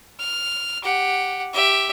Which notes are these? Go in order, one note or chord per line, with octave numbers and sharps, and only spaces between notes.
F6
G4 F#5
G4 E5